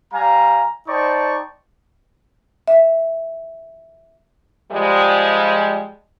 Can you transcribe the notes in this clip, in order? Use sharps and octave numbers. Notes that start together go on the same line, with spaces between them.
G3 F5 G#5 A#5
D#4 C5 D5 G5 A5 C#6
E5
F3 G3 G#3